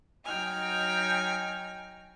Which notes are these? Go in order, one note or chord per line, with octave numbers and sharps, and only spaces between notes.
F#3 D#4 G5 G#5 F6